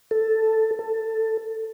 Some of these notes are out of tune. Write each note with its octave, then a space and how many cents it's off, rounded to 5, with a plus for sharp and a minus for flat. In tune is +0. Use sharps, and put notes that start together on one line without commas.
A4 +5
A4 +15